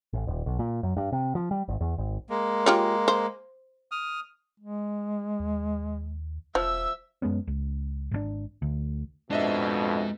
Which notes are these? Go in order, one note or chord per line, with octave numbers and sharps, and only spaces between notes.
A1
D#1
B1
A#2
F#2
G2
C3
F3
G3
G#1
E2
G#1
G#3 A#3
F4 G4 C#5
C5
D#6 F6
G#3
D#2
E1 F3 E5 E6
F#2 G#3 B3 C#4
C#2
G#1 B2 D4
D2
F2 B2 G#3 D4 C5 D#5 E5